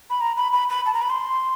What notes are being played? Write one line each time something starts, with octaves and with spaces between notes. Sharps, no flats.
B5
A#5
B5
B5
B5
A5
A#5
B5
C6